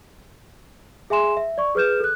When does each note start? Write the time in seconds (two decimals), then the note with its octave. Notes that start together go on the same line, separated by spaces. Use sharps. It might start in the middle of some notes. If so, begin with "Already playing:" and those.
1.10 G#4 E5 G#5 C6 E7
1.37 E5
1.58 D5 C#6
1.75 G#4 B4 F6 G6 E7
2.00 A4 F#6